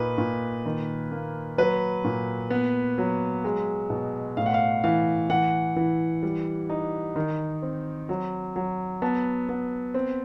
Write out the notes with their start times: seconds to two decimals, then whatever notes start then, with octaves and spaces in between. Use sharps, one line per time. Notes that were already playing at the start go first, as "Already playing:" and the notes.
Already playing: A#2 D#4 B4
0.18 A#2
0.66 D#3
1.12 A#3
1.58 F#3 B4
2.05 A#2
2.50 B3
2.98 F#3
3.44 G#3
3.90 B2
4.37 A2 F5
4.46 F#5
4.54 F5
4.84 E3 F5
5.30 E3 F#5
5.76 E3
6.23 G3
6.70 D#4
7.16 D#3
7.62 C4
8.09 F#3
8.56 F#3
9.02 B3 A5
9.49 B3
9.94 C4